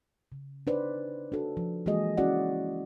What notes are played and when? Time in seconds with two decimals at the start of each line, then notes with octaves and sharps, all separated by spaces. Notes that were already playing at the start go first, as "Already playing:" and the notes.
0.32 C#3
0.67 D4 D#4 B4 C5 D5
1.32 D4 F#4 A4
1.57 F3
1.86 E3 G#3 A#3 F#4 G#4 D#5
2.17 C#4 E4 F#4 D5 F#5